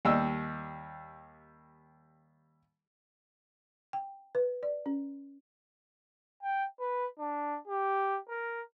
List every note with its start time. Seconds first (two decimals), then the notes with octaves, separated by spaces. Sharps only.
0.05 D#2 G3 D#5 E6
3.93 G5
4.35 B4
4.63 D5
4.86 C#4
6.43 G5
6.80 B4
7.19 D4
7.68 G4
8.29 A#4